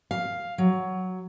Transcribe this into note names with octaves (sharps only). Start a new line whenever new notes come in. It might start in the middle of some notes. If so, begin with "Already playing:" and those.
F5
F#3